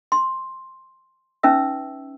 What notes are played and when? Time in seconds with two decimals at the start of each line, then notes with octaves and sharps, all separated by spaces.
0.12 C6
1.43 C#4 D#4 B4 E5 E6